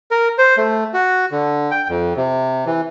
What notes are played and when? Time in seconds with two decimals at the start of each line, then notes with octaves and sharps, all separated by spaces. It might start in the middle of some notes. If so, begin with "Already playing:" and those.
0.11 A#4
0.38 C5
0.57 A3
0.94 F#4
1.31 D3
1.71 G5
1.89 F2
2.17 C3
2.66 E3